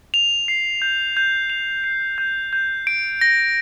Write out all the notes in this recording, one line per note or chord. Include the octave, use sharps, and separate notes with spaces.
F7
C7
G6
G6
F7
C7
G6
G6
D7
A#6